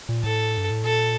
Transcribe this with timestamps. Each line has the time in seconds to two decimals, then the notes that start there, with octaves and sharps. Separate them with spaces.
0.09 A#2
0.23 A2 A4
0.57 G2
0.70 A2
0.84 A#2 A4